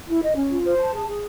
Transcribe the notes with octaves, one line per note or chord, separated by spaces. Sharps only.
E4
D#5
C#4
F4
C5
A5
G#4
G#4